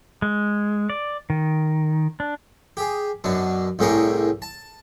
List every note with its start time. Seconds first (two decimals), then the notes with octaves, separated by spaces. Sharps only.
0.22 G#3
0.90 D5
1.30 D#3
2.20 D4
2.77 G4 G#4
3.24 F#2 B2 D4
3.79 C2 A2 G3 G#4 A#4 C#5
4.42 A5